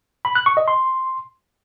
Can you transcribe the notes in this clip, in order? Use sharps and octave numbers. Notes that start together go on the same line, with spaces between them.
B5
F#6
C#6
D#5
C6